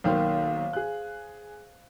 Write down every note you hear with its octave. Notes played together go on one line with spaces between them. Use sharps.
B1 D#3 A#3 C5 F5
G#4 F#6